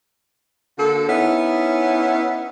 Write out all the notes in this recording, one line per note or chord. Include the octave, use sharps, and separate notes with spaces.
D3 A#3 F#4 A4
B3 C#4 D#4 E4